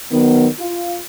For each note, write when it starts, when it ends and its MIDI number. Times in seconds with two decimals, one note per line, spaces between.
0.12 0.47 51
0.12 0.47 54
0.12 0.47 59
0.59 0.97 65